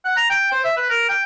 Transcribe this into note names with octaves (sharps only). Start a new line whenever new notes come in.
F#5
A#5
G5
C5
E5
B4
A#4
G5